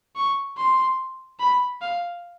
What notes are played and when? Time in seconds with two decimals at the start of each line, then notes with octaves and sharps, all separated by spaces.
0.16 C#6
0.57 C6
1.39 B5
1.81 F5